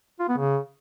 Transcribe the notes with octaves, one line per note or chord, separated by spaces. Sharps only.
F4
B3
C#3